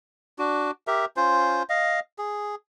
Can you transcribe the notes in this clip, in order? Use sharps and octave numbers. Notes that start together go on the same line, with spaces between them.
D4 F#4
G4 A#4 E5
C#4 F4 C5
D#5 F5
G#4